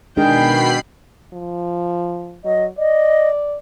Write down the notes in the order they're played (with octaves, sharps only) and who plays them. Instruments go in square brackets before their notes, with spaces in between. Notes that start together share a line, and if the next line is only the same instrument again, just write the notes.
[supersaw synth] B2 B5 C7 [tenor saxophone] D#3 [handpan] G#3 D4 G#4 [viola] G5
[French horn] F3
[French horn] F#3 [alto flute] D#5
[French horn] D5 [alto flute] D#5